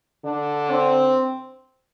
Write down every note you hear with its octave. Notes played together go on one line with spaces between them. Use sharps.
D3 D4
C4